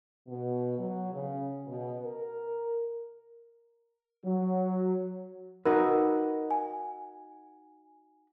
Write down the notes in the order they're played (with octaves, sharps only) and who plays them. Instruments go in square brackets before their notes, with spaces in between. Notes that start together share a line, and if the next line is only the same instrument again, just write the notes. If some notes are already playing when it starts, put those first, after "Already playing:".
[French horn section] B2
F#3
C#3
B2
A#4
[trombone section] F#3
[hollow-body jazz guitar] D#4 F#4 B4 [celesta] A#4
[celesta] G#5